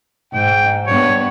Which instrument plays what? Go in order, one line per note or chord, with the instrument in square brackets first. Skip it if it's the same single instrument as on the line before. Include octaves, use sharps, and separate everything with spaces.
[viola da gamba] G#2 [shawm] G5
[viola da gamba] G2 B3 [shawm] C#5